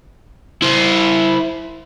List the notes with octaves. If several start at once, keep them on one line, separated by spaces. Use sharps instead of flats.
E4 C5